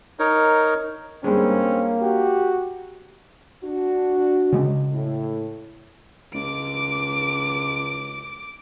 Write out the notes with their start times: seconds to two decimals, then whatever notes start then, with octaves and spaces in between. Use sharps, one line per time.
0.19 D#4 A#4 C#5
1.24 G2 G#3 A#3 C4 C#4
2.01 F#4 G4
3.64 D4 F#4
4.52 C#3 G#3 C#4
4.91 A2
6.34 C#2 D6 D7